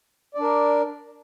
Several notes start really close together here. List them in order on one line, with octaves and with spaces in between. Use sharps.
D5 D4 A#4